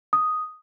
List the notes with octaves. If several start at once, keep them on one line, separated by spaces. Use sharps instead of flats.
D#6